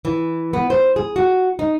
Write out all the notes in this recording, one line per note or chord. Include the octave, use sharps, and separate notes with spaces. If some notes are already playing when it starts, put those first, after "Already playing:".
E3
B3
C5
G#4
F#4
D#4